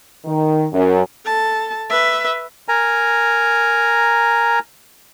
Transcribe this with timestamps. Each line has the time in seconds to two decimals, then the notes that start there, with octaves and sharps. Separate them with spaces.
0.25 D#3
0.72 F#2
1.26 A4 A5
1.89 B4 E5
2.68 A#4 G#5 A#5